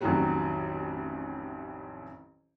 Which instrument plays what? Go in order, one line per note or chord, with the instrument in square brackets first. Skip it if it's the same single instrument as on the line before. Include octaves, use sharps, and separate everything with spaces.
[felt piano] A1 F2 D#3 E3 F#3 G3